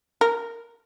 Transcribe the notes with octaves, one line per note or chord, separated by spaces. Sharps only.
A#4